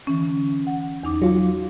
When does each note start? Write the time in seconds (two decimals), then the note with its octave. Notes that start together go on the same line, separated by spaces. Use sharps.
0.07 D3 E3 C#4
0.67 F#5
1.03 E2 D#4 D6
1.22 F#3 F4